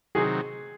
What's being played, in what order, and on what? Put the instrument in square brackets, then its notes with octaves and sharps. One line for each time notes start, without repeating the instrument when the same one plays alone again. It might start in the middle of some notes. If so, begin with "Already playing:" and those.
[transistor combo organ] C3 D#3 F#3 [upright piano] G#4